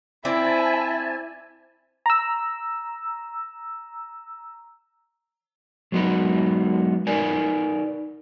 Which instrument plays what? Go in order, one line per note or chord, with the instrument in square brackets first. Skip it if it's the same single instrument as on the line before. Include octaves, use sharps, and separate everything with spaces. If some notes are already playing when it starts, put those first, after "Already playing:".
[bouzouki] C4 D5 [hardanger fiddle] E4 [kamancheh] E5 [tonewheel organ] G#5 A5
[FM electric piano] A#5 E6
[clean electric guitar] F#3 G#3 B3 D#4 B4
D#4 A#4 B4 D5 G#5